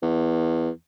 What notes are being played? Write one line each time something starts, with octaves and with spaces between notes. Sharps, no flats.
E2